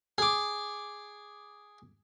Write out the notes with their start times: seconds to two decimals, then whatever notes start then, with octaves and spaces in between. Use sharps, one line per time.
0.18 G#4 D6